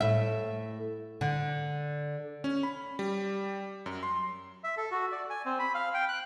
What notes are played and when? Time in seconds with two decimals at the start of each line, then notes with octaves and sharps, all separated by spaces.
0.01 A2 E5
1.21 D3
2.44 C#4
2.63 B5
2.99 G3
3.86 F#2
4.03 C6
4.64 E5
4.77 A4
4.91 F#4
5.12 D5
5.30 G#5
5.46 C4
5.59 B5
5.75 F5
5.94 G5
6.09 F#6